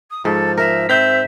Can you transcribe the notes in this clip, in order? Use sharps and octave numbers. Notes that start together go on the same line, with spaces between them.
D#6
G#2 F3 A4
A#4 E5
C4 E5 G6 B6